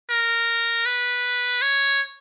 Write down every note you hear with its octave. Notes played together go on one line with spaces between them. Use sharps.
A#4
B4
C#5